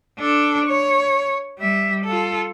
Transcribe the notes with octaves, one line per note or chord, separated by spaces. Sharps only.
D4 A4
C#5
G3 E5
F4 A4